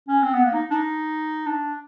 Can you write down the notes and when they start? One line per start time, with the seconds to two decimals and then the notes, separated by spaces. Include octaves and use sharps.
0.08 C#4
0.23 C4
0.33 B3
0.44 A#3
0.54 D#4
0.71 D4
0.74 D#4
1.47 D4